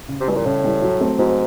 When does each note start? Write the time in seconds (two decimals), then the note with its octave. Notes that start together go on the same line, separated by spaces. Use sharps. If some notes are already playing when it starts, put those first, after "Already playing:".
0.09 C#3
0.20 C3
0.28 B2 E3 G3
0.37 A#2
0.46 A2 C#3
0.64 E3 G3
0.82 F#3
1.01 A3 C4
1.18 G#2 F#3